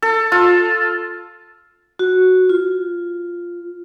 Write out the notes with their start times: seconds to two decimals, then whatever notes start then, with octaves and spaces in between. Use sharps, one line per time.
0.02 A4
0.32 F4
1.99 F#4
2.49 F4